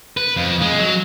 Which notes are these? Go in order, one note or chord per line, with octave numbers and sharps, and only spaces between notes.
B4
F2
G#3
F#3